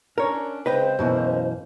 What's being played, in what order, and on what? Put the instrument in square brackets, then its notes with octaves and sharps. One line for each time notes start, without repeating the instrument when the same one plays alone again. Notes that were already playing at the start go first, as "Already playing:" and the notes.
[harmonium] C#4 D4 [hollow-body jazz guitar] A#4 C#5
[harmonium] C#3 G#3 C4 [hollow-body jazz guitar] B4 D#5 G5 [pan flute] C5
[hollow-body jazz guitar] F#2 B2 E3 [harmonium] G#3 A#3 C#4